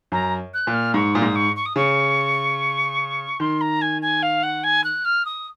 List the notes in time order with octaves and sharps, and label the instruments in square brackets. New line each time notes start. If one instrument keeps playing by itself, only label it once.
[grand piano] F#2 [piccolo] A#5
[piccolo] F#6
[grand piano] A#2
[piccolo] F6
[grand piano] G#2 [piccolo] C#6
[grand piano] A#2 [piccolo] D#6
[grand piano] G#2
[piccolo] C#6
C#6
D#6
[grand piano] C#3 [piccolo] C#6
[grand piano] D#3 [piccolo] C6
[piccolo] A#5
G#5
G#5
F5
F#5
G#5
F#6
F6
D#6